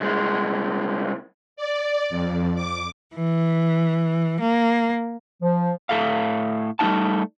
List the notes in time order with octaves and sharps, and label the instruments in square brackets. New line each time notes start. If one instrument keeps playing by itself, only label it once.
[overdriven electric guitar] C2 G#3
[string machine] D5
F2
D6
[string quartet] E3
A#3
[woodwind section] F3
[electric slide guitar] A2 A4 E5 F5
G3 A3 A#3 D#4 F#5 A5